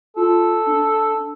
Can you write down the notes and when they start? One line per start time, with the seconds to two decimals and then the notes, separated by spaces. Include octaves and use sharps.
0.16 F4 A4
0.66 D4